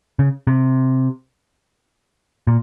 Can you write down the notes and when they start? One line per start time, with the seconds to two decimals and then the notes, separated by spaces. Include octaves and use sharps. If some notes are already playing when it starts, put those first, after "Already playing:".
0.19 C#3
0.47 C3
2.47 A#2